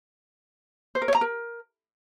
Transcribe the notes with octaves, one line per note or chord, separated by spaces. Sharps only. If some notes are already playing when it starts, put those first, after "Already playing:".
C5
A#4
C#5
A#5
A#4